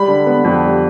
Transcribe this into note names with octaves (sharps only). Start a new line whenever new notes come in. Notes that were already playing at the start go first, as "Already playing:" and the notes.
Already playing: G3 B5
D3
B3
F2
G3